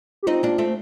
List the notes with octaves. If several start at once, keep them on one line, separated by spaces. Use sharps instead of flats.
G4
C4 D#4 F4
A#3 D4
A3 C4